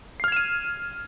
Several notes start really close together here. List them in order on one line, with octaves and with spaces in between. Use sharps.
C7 F6 G#6 E7 D#7